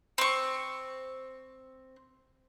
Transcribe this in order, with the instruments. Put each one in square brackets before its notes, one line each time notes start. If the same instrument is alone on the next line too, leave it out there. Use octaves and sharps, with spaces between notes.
[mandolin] C4 C#6